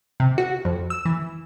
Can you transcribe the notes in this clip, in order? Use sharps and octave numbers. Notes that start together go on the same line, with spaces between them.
C3
F#4
F2
E6
E3